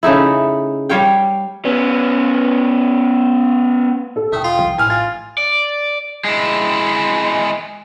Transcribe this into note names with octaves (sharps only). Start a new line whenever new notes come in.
C#3 A3 D#4 E4
G3 C#5 F5 G5
B3 C#4
A4
E1 A3 G5 D#6
F4
C2 F3
A1 A2 E3 G#5 F6
F4 A6
D5
G#3 E4